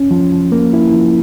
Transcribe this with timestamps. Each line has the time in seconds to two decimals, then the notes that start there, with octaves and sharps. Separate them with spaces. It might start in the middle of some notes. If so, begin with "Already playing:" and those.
Already playing: C#4
0.11 F3
0.32 F3
0.52 A#3
0.73 E4
0.94 F3